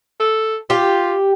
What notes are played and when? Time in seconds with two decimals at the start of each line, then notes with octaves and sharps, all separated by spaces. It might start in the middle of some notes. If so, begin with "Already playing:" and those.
0.20 A4
0.70 F4 G4